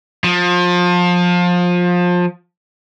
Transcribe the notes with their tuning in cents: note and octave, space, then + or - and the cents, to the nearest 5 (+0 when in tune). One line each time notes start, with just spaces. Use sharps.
F3 +25